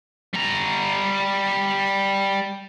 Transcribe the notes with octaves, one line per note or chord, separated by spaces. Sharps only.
G3 A#5